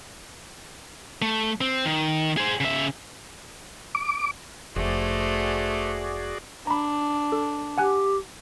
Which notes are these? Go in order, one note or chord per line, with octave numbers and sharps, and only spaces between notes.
A3
C4
D#3
G#4 C5
C#3 E5
D6
F1 A3 F#4 G#4 C5 D5
D4 A#5 B5
A4
G4 F#5 G#5 F#6